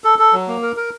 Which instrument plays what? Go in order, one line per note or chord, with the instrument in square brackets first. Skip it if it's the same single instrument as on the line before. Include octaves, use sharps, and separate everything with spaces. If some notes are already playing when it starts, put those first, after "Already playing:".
[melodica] A4
A4
F#3
A#3
A#4
A#4